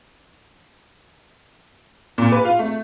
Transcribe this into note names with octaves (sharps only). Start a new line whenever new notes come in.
A#2
B4
F4
A3